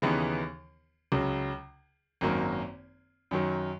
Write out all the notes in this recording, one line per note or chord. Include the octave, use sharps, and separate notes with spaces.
D#2 C#3 E3 B3 D#4
C#2 C#3 F#3
G#1 F#2 D#3 F#3 A#3
F#2 D#3 F#3